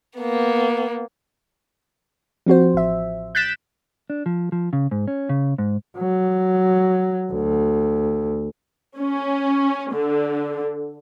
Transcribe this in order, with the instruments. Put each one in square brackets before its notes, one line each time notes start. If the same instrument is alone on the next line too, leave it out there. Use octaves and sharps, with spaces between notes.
[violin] A#3 B3
[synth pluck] F3 C4 F#4 C5
A1 E5
F#6 G6 A6 B6 D7 E7
[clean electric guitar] D4
F3
F3
C#3
G#2
C#4
C#3
G#2
[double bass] F#3
D2
[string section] C#4
D3